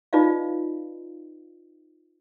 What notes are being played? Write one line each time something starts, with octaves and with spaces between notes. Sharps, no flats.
D#4 F4 B4 D5 D#5 F5